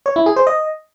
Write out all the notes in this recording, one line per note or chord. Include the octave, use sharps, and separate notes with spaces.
C#5
E4
G#4
C5
D#5